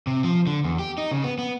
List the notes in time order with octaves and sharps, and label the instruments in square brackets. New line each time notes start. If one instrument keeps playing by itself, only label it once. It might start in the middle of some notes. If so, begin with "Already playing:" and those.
[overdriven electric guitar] C3
F3
D3
E2
G4
D#4
C#3
B3
B3